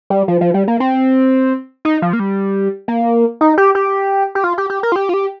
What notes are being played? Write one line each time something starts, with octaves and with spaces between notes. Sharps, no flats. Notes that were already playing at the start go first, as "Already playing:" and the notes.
G3
F3
F3
G3
A#3
C4
D#4
F3
A#3
G3
A#3
D#4
G4
G4
G4
F4
G4
G4
A#4
F4
G4
F4
G4